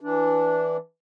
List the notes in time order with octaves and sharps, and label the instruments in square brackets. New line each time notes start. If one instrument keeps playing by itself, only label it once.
[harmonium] E3 D4